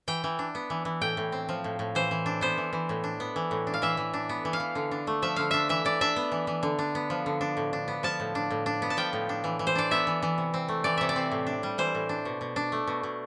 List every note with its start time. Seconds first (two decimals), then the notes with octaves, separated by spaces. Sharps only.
0.08 E3 G5
0.24 E3
0.39 D4
0.55 B3
0.70 E3
0.85 E3
1.01 A2 G5
1.17 A2
1.32 C4
1.49 F3
1.64 A2
1.79 A2
1.95 E3 C5
2.11 E3
2.26 D4
2.41 B3 C5
2.57 E3
2.73 E3
2.89 A2
3.04 D4
3.20 B3
3.36 E3
3.51 A2
3.67 D4
3.74 F5
3.82 E3 E5
3.97 E3
4.14 D4
4.29 B3
4.45 E3
4.53 F5
4.60 E3
4.75 D3
4.91 D4
5.07 A3
5.22 F3 E5
5.36 D3 F5
5.51 D4 E5
5.69 E3 E5
5.85 E3 D5
6.01 D4 E5
6.16 B3
6.32 E3
6.47 E3
6.63 D3
6.79 D4
6.95 B3
7.10 F3
7.26 D3
7.41 D4
7.57 A2
7.73 D4
7.88 B3
8.03 F3 A5
8.20 A2
8.35 D4
8.50 A2
8.66 D4
8.82 B3
8.90 A5
8.97 F3 G5
9.13 A2
9.29 D4
9.44 E3
9.59 E3
9.67 C5
9.75 D4 D5
9.91 B3 E5
10.07 E3
10.23 E3
10.38 C3
10.54 C4
10.69 A3
10.84 E3 D5
10.97 C3 E5
11.09 D5
11.16 C4
11.31 A2
11.47 D4
11.63 G3
11.78 E3 C5
11.95 A2
12.09 D4
12.25 B2
12.41 B2
12.56 D4
12.72 A3
12.87 B2
13.03 B2